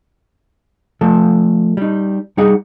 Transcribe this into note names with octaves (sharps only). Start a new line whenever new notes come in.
F3 A3 A4
G3 D#4
G3 D#4 G#4 F#5